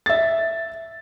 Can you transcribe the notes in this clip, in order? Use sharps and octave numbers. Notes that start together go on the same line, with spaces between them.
E5 A6